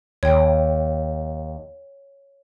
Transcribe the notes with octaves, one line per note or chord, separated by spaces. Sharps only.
D#2 C#5 G5